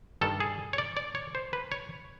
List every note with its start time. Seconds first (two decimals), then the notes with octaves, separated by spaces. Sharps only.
0.21 G2 D#3 A4
0.40 G#4
0.73 C#5
0.78 D5
0.97 D5
1.15 C#5
1.35 C5
1.53 B4
1.72 C#5